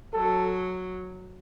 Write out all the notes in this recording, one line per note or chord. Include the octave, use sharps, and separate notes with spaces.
F#3 A4